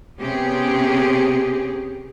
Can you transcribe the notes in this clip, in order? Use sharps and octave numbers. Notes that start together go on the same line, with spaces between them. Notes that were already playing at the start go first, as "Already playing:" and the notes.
C3 B3 C#4 G4 G#4